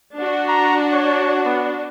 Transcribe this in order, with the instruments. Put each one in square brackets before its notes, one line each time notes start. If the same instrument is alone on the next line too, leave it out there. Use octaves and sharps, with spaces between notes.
[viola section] D4 F#4
[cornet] A#5
C#5
B3